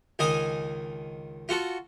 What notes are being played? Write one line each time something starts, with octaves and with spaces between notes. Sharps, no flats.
C#2 D#3 D#4 G#5 D#6
F4 F#4 A4